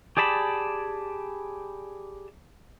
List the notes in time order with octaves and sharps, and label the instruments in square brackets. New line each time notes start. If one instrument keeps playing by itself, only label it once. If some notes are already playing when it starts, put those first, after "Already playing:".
[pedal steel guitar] G4 G#4 D5 A5 B5